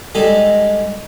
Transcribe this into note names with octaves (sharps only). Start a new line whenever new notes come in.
G3 G#3 D#4 A4